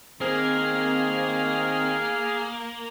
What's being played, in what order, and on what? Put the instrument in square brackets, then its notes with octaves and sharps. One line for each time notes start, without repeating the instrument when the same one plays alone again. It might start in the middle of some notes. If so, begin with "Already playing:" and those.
[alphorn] D#3 [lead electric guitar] A#3 [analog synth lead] C4 [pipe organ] G#4 F6